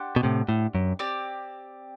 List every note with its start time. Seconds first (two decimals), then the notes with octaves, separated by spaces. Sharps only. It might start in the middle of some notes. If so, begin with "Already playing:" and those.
Already playing: D4 G4 C5 F#5
0.16 B2
0.23 A2 C3
0.49 A2
0.75 F#2
0.99 C4 G4 D5